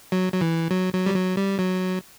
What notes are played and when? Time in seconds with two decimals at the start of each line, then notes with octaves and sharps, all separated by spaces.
0.12 F#3
0.32 F#3
0.41 E3
0.71 F#3
0.94 F#3
1.06 G3
1.15 F#3
1.37 G3
1.59 F#3